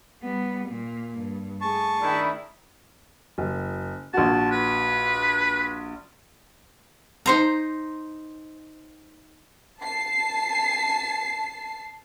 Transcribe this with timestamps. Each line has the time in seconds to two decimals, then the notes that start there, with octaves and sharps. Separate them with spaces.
0.21 G3 B3
0.68 A#2 A#3
1.18 G2
1.61 A3 G#4 A5 C#6
2.01 D#3 D4 E4
3.38 F#1
4.14 A#1 F#4 A5
4.51 B4
7.26 D#4 C5 A#5
9.81 A5 C7